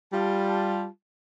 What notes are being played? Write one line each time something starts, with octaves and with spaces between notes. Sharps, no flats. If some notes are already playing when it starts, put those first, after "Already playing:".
G3 F4 A5